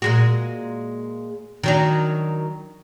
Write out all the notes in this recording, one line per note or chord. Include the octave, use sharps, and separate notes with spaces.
A#2 G#3 F#4
D#3 F#3 D4